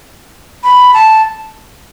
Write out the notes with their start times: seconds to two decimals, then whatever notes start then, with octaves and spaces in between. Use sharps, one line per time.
0.64 B5
0.94 A5